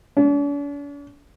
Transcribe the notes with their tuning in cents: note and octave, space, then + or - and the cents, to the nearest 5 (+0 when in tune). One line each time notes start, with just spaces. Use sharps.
D4 -45